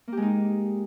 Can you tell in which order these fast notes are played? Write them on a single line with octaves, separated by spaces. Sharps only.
A#3 G4 G#3 D#4